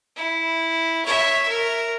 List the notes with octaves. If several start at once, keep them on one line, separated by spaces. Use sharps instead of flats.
E4
C#5 E5
A#4